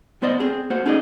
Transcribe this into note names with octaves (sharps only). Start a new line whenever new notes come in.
C2 B3 C5 D5 D#5
C4 G#4 A4
A#3 F#4 C5 F#5
C#4 D#4 G#4 D5 D#5